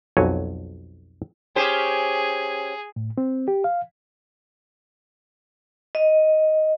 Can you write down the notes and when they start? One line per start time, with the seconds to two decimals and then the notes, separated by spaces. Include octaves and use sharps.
0.17 B1 F2 F#3 C#5 G#5
1.56 C#4 G4 G#4 C5
2.96 A2
3.18 C4
3.48 G4
3.64 F5
5.95 D#5